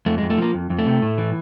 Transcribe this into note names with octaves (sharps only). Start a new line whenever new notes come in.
F2 A3
G#3
F2
A3
F3 A#3
F2
F2
A3
C3
A2
E3